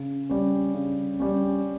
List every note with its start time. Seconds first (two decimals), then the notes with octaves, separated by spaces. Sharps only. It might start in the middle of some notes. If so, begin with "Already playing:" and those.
Already playing: C#3
0.29 G3 C#4
0.74 C#3
1.20 G3 C#4